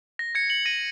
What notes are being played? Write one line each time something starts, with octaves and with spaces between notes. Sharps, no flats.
A#6
G#6 C#7
C#7 F#7
A#6 D#7